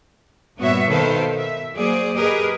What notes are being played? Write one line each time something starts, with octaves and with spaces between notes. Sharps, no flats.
G2 A#2 B3 F#4 C#5 E5
B2 D#3 A4 B4 C5 F5
E5
F#3 A#3 G#4 C5 D5
G4 G#4 A#4 B4 D#5